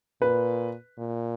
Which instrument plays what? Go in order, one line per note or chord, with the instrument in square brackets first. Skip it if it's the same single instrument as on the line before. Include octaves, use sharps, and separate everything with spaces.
[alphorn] A#2 [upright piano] B4
[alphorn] A#2